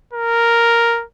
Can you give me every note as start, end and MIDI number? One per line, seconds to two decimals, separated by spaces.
0.13 1.04 70